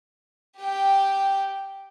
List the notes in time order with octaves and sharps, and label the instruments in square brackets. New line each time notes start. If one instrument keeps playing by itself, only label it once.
[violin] G4 G5